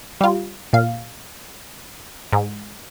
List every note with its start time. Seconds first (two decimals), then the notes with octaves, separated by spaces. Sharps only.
0.21 G3 F4
0.73 A#2 F5
2.33 G#2